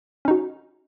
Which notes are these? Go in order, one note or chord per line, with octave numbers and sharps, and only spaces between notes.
C#4 D#4 F#4